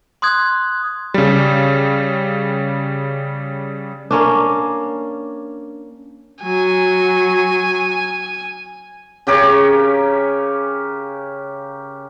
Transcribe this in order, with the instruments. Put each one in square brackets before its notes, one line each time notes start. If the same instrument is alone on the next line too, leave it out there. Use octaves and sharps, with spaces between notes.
[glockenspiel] C6 D#6 F#6 G#6
[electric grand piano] C#3 G3
[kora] A#3 C#4 D4
[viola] F#3 [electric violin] G#5
[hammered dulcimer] C#3 G4 A#4 C#5